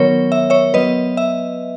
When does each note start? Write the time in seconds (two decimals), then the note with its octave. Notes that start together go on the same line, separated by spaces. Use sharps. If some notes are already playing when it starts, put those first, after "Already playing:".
Already playing: D#3 F#3 B3 A#4 C#5
0.32 E5
0.50 C#5 E5
0.74 F#3 B3 B4 D#5
1.17 E5